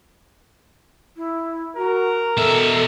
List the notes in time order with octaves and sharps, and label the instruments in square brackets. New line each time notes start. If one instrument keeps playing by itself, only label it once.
[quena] E4
[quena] F#4 [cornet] A#4
[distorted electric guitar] B2 E5 [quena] A4